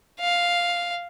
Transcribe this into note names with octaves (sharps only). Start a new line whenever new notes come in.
F5